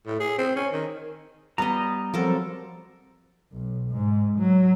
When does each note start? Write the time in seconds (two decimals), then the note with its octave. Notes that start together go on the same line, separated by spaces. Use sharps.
0.06 A2
0.20 G#4
0.38 C4
0.56 C#4
0.72 D#3
1.58 G3 B3 D#5 A#5
2.14 F3 F#3 C4 A4 A#4
3.53 B1
3.91 G#2
4.39 F#3